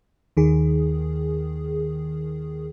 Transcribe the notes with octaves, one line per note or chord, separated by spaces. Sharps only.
D#2 D#3 G#4